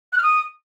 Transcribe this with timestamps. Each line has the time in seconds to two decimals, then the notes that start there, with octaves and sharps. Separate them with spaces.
0.13 F#6
0.18 F6
0.23 D#6